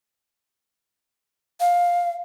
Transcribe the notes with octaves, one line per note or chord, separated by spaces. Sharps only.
F5